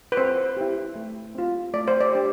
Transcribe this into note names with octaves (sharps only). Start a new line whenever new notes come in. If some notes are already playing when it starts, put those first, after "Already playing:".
B4
C4 C5
E4 G4
A3
C4 F4
A3 D5
C5
D5
D4 G4